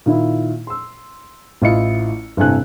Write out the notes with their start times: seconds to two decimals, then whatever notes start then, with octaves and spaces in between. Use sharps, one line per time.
0.06 A#2 D#3 E4
0.67 C6 E6
1.62 A1 E4 F4 D#5 C#7
2.37 G1 A2 C3 A4 G#5 F#6